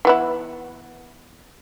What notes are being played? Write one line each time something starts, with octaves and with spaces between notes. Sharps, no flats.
E3 B3 E4